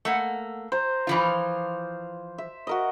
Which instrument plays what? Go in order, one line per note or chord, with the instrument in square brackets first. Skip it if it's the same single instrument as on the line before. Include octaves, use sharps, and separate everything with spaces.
[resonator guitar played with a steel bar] A3 A#3 F#5
[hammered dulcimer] C5 A#5
[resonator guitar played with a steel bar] E3 F3 F4
[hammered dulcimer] E5
F#4 A#4 D#5